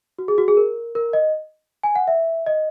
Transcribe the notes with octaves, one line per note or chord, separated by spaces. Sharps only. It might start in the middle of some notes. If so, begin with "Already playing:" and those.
F#4
G#4
F#4
G#4
A#4
A#4
D#5
G#5
F#5
E5
D#5